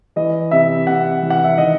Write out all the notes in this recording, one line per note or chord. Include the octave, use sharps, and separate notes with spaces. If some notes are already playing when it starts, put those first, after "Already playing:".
E3 D#5
C3 E5
C3 F#5
E3
F#5
E5
D#3 D#5